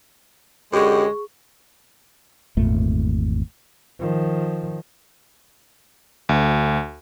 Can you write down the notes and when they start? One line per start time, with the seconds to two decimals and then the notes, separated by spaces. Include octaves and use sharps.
0.73 F#2 D3 G#3 G4 G#4 C#6
2.57 G#1 E2 A#2 A3
4.00 D#3 F3
6.29 D2